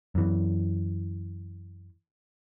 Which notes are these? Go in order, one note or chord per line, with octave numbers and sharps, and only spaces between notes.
F#2 E3